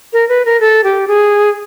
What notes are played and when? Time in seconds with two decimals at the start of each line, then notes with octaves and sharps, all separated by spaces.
0.13 A#4
0.29 B4
0.45 A#4
0.60 A4
0.84 G4
1.08 G#4